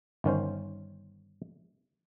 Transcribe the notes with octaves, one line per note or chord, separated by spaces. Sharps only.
G1 D#3 C#4 C5